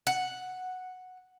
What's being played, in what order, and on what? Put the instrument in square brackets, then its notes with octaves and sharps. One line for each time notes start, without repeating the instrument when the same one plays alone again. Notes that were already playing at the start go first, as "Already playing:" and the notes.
[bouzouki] F#5